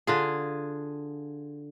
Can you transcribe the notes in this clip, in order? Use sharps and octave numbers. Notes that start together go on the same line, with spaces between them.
D3 F4 G#4